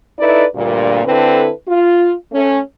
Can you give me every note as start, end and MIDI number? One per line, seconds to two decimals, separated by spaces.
0.19 0.45 63
0.19 0.45 64
0.19 0.45 69
0.19 0.45 71
0.19 0.45 74
0.55 1.04 38
0.55 1.04 43
0.55 1.04 46
1.05 1.51 50
1.05 1.51 60
1.05 1.51 64
1.05 1.51 69
1.05 1.51 71
1.68 2.13 65
2.32 2.58 57
2.32 2.58 61